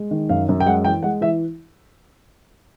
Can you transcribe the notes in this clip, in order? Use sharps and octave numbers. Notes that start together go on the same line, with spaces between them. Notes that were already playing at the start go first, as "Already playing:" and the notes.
Already playing: G#3
D#3
F#2 F5
F#2
G5
G#3 F#5
E3 G5
G#3 F#5
E3 E5